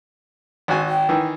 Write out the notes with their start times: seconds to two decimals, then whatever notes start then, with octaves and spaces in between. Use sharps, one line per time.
0.68 G#1 F#4 G#5
0.89 G5
1.09 D#3 E3